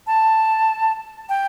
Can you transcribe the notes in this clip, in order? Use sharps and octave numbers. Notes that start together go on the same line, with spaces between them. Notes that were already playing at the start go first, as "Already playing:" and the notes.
A5
G5